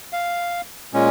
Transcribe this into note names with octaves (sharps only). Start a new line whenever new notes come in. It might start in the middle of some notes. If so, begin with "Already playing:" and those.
F5
A#2 G#3 C#4